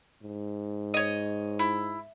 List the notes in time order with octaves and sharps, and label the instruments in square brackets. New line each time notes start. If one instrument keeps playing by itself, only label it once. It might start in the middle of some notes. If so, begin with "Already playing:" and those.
[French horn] G#2
[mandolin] C#5 D#5
E4